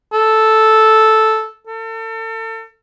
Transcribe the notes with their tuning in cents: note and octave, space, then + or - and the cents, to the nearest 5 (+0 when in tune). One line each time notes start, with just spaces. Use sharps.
A4 -5
A4 +35